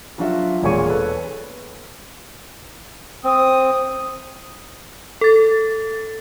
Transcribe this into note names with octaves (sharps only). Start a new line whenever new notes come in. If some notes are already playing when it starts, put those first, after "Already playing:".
F3 F#3 D4 F4 F#4 E5
E1 A#2 G#3 C#5 C#6 D#7
A4 B4
C4 D#6
A4 A6